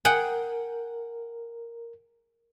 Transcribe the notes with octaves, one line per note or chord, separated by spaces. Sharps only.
G#4 A#4 F#5 G5